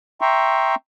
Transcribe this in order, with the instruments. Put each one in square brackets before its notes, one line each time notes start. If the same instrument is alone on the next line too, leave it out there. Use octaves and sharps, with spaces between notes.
[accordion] E5 G5 A#5 C6 C#6